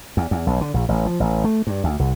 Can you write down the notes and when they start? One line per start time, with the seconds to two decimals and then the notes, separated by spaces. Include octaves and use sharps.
0.17 E2
0.31 E2
0.47 B1
0.61 D3
0.74 A#1
0.89 A1
1.06 F3
1.20 A1
1.44 A3
1.67 G2
1.84 D2
1.99 C2